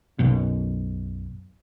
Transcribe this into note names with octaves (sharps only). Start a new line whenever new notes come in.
B1 F#2 B2